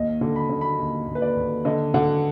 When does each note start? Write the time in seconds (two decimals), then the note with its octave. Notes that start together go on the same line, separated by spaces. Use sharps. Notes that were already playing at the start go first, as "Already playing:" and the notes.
Already playing: D#2 D#5
0.21 D3
0.36 B5
0.49 D3
0.61 B5
0.79 D#2
1.07 D#2
1.15 B4
1.22 D5
1.36 D#2
1.65 D3 D#5
1.94 D3 F#5